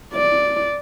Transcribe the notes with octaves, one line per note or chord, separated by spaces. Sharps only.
D5